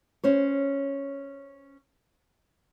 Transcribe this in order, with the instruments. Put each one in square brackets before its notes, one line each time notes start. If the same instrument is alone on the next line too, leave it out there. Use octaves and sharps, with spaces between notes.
[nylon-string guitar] C#4 C5 C#5